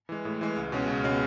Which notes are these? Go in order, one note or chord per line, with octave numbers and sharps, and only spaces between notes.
E3 G#3
A2
E3 G#3
C#2
B2 G#3 C#4
C#2
B2 G#3 C#4